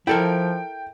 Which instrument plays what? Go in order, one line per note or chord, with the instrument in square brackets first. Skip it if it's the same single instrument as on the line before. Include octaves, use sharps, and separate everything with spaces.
[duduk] F3 [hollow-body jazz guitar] E4 A4 A#4 [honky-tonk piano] G5